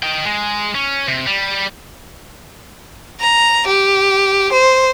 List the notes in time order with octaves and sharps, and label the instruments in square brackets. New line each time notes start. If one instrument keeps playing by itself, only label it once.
[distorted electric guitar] D#4 G5
G#3
C#4
C3
G3
[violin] A#5
G4
C5